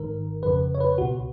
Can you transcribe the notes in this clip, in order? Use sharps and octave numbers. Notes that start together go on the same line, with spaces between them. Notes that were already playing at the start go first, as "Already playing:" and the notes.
Already playing: G#1 G#2 D#3 A#4
F2 C#3 B4
C#5
B4
C#2 B2 F#4